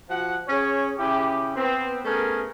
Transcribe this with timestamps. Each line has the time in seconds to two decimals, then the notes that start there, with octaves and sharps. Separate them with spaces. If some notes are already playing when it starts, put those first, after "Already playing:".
0.10 F3 F#4 F#5
0.48 C#4 G#4 C#5
0.99 C#3 E4 G4
1.56 B3 C4
2.04 A3 B3 C#4 G#4 A#4